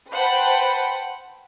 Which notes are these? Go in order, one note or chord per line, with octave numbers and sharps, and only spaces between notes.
B4 C5 F#5 G5 A5 B5